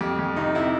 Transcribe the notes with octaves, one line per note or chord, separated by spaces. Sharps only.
F2 G4
F2
C3 D#4
C3 E4